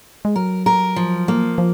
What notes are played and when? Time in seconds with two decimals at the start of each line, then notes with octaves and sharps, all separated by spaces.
0.25 G#3
0.36 F#3 A#4
0.66 A#4
0.96 F3
1.28 A#3
1.58 F3